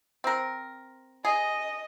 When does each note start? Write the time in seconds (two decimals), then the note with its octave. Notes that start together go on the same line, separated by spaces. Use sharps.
0.24 C4 A#4
1.25 G#4 D#5